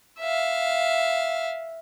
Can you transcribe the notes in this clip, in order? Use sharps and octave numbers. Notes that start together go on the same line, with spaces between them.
E5 F5